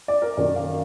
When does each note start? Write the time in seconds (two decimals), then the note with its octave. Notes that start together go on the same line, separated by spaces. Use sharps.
0.08 D5
0.22 A#4
0.37 F#2 D#3 A#3 D5
0.56 F5